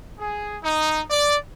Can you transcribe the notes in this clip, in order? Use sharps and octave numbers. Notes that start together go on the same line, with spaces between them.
G#4
D#4
D5